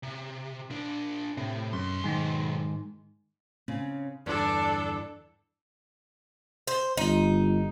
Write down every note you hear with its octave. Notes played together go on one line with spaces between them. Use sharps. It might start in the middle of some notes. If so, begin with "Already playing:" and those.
C3
A#2 D4
A2 C3
B1 F#2 C6
G#2 D#3 G#3
C#3 C4 C#4
E2 G2 D3 D4 A4
C5
G1 D#4